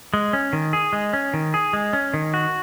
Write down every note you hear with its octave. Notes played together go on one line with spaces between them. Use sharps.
G#3
C#4
D#3
G#4
G#3
C#4
D#3
G#4
G#3
C#4
D#3
F#4